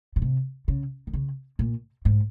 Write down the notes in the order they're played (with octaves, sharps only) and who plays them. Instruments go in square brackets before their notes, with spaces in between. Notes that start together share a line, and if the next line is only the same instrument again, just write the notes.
[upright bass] A#2
C3
C#3
D#3
C#3
A#2
G#2